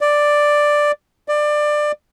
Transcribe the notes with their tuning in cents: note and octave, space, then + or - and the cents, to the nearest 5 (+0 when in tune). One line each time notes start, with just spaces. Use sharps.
D5 +5
D5 +20